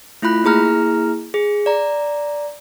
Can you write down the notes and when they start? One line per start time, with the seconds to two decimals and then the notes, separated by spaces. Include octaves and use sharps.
0.22 A3 E4 F4 B5 F#6
0.44 A#3 E4 G#4 A#5 F6
1.34 G#4
1.66 D5 A#5